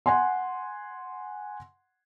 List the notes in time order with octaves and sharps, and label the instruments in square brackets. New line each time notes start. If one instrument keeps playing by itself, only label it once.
[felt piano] F#5 G#5 C6